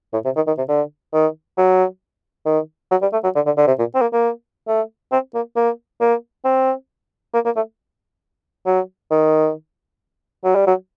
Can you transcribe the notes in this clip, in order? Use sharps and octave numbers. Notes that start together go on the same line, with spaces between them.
A2
C3
D#3
D#3
C3
D3
D#3
F#3
D#3
F#3
G3
A3
F#3
D3
D3
D3
C3
A#2
C4
A#3
A#3
A3
C4
A#3
A#3
A#3
C4
A#3
A#3
A3
F#3
D#3
F#3
G3
F#3